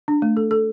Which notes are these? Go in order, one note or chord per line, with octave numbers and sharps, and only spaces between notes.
D4
A3
A4
A4